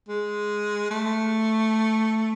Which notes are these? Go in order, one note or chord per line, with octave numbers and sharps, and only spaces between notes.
G#3
A3